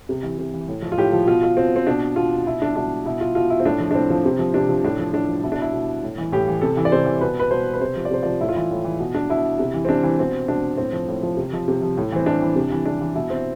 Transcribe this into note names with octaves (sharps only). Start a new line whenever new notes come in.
C3
E3
C3
E3
A2
F3
F4
A2 G4
F3
B2 F4
F4
B2 C4
C4
B2 D4
B2 F4
B2 E4
D4
B2 D4
B2 E4
F4
B2 F4
E4
C4
A2 D4
F3
D4
A2 C4
F3
C3
F3
C3 D4
F3
A2 D4
F3
A2 D4
F3
B2 E4
D4
E4
B2
A2
E3
A2 G4
E3
C3 A4
E3
D5
C3 C5
E3
B2 B4
B4
B2 C5
B4
C3 C5
F3
D5
C3 C5
F3 D5
A2 E4
F4
E3 E4
A2
E3
B2
D4
B2 E4
C3
E3
C4
C3 D4
E3
B2 C4
B2 D4
A2 C4
F3
A2
F3
C3
F3
C3
F3
A2
E3 C4
A2 D4
E3
C3
E3
C3 D4
E3
B2 E4
C4